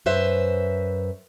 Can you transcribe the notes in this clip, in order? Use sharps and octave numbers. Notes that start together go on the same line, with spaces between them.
F#2 B4 C5 E5